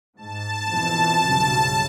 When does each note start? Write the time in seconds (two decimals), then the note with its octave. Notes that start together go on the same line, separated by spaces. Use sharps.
0.17 G#2 A5
0.68 F2 B2 E3
1.24 B1 G2 C#3